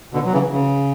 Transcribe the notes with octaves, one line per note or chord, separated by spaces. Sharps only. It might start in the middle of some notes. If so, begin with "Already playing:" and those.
B2 D3
F#3
C#3 E3
C#3